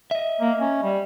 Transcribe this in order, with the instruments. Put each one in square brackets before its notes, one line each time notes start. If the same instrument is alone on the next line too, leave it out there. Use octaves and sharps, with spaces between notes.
[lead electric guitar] D#5 E5
[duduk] A#3
C#4
G3